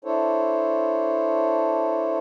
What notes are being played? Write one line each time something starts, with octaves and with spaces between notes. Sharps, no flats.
D4 E4 A4 C5 C#5